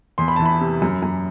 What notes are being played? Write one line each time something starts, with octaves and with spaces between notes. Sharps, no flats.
E2 C6
B5
E3 A5
B5
C3
F#2
F#2